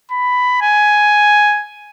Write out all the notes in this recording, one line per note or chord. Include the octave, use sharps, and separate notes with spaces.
B5
G#5